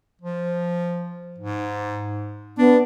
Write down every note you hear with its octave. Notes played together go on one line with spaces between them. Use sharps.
F3
G#2
B3 D4